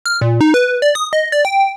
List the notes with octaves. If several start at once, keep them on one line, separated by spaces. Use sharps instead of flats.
F6
A#2
D#4
B4
D5
D#6
D#5
D5
G5